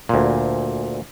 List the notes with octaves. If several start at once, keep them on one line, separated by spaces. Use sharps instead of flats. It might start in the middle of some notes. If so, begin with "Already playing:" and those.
D2 A#2